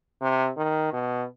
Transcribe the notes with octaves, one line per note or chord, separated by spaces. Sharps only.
C3
D#3
B2